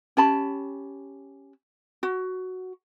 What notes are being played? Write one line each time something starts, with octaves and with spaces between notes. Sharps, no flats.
C#4 G4 A5 B5
F#4